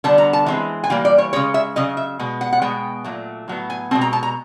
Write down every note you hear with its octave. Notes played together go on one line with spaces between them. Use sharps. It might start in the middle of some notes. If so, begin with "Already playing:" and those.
D3 G3 B3 A5
A#5
A5
E3 G#3 C4
G#5
E3 G3 A#3 G5
D5
C#5
C#3 E3 G#3 C#5
E5
C#3 F#3 D#5
E5
B2 G#3 B3
F#5
F#5
B2 G#3 B3 G5
A#2 F#3 A3
A2 F#3 B3
G#5
B2 G#3 C4 A5
A#5
A5
A#5